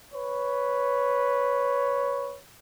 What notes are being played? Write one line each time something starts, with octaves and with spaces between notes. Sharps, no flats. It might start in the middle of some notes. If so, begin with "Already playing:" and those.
B4 C#5